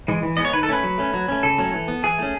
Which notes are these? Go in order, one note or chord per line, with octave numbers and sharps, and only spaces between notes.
E3 G#3
E3
G#3 B3 D#5
C#5
D#3 B4
A4
A3 C#4 B4
F#3
A3 C#4
F#3
A3 C#4
C#3 A4
F#3 A3 C#4
E3
B3
E3 G#4
A3 C#4